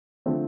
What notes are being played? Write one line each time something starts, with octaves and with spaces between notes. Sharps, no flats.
D3 F3 A3 C4